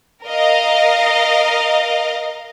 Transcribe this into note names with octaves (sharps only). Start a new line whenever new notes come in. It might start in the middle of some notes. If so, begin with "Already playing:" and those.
A#4 D#5 F5